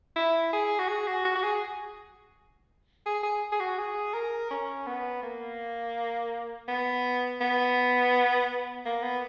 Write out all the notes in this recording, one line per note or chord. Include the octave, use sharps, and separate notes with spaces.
E4
G#4
F#4
G#4
F#4
F#4
F#4
G#4
G#4
G#4
G#4
F#4
G#4
A#4
C#4
B3
A#3
B3
B3
A#3
B3